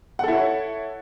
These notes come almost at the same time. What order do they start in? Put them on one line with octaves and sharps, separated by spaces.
F#5 A4 E4 C#5